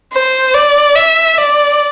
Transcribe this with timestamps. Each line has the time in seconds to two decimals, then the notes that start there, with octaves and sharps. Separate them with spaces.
0.13 C5
0.54 D5
0.96 E5
1.38 D5